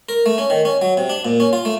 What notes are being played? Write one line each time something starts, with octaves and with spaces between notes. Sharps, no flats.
A#4
A3
C#4
D#3
C#4
F#3
C3
D4
A#2
C#4
F4
A3